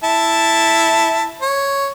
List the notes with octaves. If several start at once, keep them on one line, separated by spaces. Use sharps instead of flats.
E4 A5
C#5